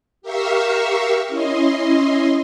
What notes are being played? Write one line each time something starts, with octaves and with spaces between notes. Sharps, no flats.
G4 A#4 E5 F5 C#6 E6
C#4 E4 D#5 C6